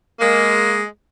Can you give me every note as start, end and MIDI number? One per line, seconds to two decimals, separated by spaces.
0.20 0.82 56
0.20 0.82 58